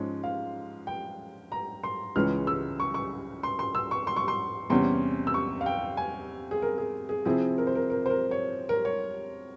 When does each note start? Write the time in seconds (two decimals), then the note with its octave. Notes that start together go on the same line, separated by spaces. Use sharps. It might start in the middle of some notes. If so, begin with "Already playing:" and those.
Already playing: G#2 F3 G#3 C#4
0.24 F5
0.87 G5
1.52 A#5
1.84 C6
2.16 C#2 C#3 E3 G#3 C#4 F6
2.47 E6
2.80 C#6
2.94 C#6
3.43 C6
3.59 C6
3.75 E6
3.91 C#6
4.07 C6
4.16 C#6
4.28 C6
4.70 E2 C3 G3 C#4 C6
5.27 E6
5.34 C#6
5.61 F5
5.66 G5
5.97 G#5
6.51 G#4
6.62 A#4
6.78 G#4
7.09 G#4
7.25 C3 F3 C4 E4 G#4
7.58 A#4
7.67 C5
7.75 A#4
7.90 A#4
8.06 C5
8.10 A#4
8.31 C#5
8.69 A#4
8.85 C#5